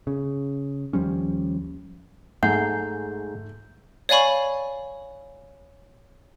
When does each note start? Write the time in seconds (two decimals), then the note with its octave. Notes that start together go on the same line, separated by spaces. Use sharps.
0.07 C#3
0.93 D#2 F3 G3 C#4
2.43 G#2 A3 F#5 G#5 A#5 G6
4.09 C#5 D5 F5 G#5 B5 C#6